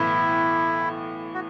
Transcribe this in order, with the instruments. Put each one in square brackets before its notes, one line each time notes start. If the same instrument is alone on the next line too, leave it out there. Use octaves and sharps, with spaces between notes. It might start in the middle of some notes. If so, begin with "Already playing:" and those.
Already playing: [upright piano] B1 A2 E3 [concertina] E4
[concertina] F#4